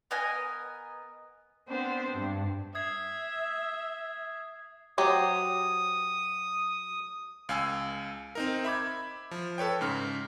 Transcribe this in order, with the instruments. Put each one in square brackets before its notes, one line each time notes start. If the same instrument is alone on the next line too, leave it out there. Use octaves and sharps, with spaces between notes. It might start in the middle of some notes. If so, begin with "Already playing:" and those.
[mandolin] B3 A#4 D#5 G#5
[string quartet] B3 C4 D4 C5
G2
[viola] E5 [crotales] D#6 G#6 C7
[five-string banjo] F#3 G4 C5 [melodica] D#6
[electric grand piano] C#2 F5 G#5 E6
C4 D#4 A#4
E5 B5 D6 G#6
F3
A4 B4 C#5 G5
G#2 C#3 F6